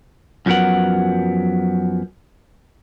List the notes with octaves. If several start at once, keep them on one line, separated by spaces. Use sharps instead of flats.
F#2 F3 F#3 B3 A#4 F#5